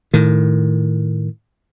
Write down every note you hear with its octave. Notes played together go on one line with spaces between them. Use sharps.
A2 D#3